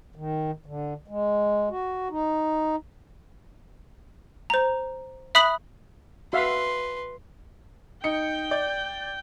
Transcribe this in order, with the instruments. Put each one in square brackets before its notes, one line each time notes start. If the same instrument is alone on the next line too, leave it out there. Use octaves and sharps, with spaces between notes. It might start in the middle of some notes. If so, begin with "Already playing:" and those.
[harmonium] D#3
D3
G#3
F#4
D#4
[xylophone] C5 A#5
E5 B5 D#6 F#6 B6 F#7
[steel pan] F#4 E5 F5 [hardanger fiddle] B4 C6
[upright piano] D#4 C#7 [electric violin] G5 G6
[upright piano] D5